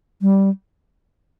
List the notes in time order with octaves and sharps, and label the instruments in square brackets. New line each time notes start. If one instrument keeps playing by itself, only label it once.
[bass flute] G3